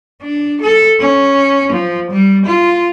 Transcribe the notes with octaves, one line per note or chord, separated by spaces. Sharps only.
D4
A4
C#4
F3
G3
F4